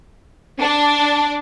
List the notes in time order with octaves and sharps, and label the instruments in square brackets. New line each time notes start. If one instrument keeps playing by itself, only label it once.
[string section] D4